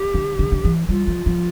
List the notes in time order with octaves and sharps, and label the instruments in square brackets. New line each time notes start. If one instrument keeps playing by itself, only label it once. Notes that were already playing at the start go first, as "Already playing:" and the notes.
Already playing: [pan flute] G4
[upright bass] D3
D3
D3
E3
[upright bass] G3 [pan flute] F4
[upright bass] F3
F3